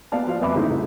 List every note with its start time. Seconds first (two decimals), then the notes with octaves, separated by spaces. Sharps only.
0.12 B3 D5 F5 A5
0.27 F3 F5
0.41 F2 B4 E5 B5 D6
0.55 C#3 A3 C4 D#4 E4
0.70 C2